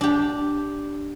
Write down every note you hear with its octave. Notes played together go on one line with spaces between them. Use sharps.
D4 G4